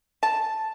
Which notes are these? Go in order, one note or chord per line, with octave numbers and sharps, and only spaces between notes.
A5